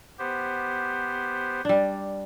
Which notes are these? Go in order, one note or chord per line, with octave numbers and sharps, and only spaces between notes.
B3 G4 C5
G3 D4